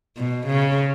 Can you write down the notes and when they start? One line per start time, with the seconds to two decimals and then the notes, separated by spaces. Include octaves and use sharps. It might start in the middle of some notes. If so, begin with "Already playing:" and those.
0.17 B2
0.46 C#3